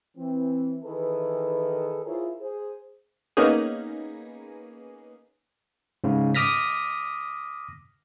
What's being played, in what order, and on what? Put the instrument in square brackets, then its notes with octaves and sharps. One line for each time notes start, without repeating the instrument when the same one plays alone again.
[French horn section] E3 C4
D#3 E3 G#4 A4 B4
E4 F4 G#4 A#4 C5 C#5
G#4 C5
[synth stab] A#3 B3 C#4 D#4 G#4
[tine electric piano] G#2 C#3
D6 D#6 F6 A#6 B6